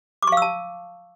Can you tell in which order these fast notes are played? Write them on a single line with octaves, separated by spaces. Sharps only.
D6 C#6 F5 E6 A5